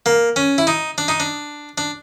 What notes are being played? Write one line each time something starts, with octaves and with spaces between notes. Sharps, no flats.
A#3
C#4
E4
D#4
D4
D#4
D4
D4